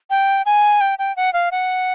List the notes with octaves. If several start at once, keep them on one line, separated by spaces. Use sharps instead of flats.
G5
G#5
G5
G5
F#5
F5
F#5